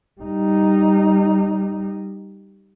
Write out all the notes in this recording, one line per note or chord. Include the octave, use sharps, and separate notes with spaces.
G3 D#4